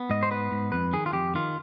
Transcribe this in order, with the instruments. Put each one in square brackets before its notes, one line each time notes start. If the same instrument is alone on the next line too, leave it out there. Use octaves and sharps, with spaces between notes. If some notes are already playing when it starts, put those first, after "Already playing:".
Already playing: [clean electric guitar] B3
G#2 D#5
C5
B3 B4
G#2
F2 B4
D#3 G#4
F4
F2 G4
D#3 F4